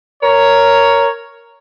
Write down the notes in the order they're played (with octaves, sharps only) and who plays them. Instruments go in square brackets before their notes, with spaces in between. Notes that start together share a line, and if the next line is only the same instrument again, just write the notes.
[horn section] A#4 C#5